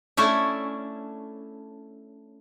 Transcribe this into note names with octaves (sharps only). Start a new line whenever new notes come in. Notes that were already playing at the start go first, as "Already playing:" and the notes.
A3 C#4 D4 E4